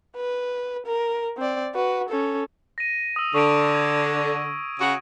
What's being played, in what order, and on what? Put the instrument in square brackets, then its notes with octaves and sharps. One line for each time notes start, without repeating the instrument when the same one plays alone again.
[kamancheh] B4
A#4
C4 D5
F#4 B4
C#4 A4
[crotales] A#6 D#7
D#6 E6
[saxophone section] D3 [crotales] C#6 D7
[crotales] G#6
[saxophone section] C#3 F#4